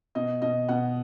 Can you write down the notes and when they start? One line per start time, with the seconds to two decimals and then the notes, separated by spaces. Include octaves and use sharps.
0.15 B2 D#5
0.42 B2 D#5
0.69 B2 F#5